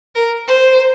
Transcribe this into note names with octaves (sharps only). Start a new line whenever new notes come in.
A#4
C5